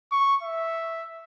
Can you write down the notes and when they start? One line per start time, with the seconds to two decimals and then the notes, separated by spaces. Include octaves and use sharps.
0.12 C#6
0.43 E5